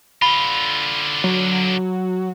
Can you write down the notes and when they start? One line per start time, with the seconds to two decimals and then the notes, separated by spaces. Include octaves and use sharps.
0.22 D3 F4 B5
1.24 F#3